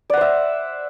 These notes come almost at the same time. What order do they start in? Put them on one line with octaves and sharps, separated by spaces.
D5 F#5 C5 E5